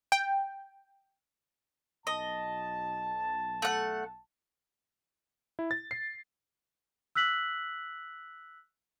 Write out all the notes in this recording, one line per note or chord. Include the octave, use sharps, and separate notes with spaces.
G5
B1 D#5 A5
A3 F#5
E4
A6
C7
E6 F#6 B6 F#7